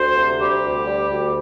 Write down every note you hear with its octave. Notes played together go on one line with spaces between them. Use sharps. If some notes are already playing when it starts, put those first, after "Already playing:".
Already playing: D2 C5
C3
G3 G4
D2
G3
D2